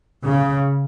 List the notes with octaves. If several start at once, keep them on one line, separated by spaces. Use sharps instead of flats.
C#3